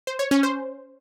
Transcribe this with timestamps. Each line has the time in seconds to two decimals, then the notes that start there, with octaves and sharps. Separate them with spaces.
0.07 C5
0.19 C#5
0.31 C#4
0.43 C5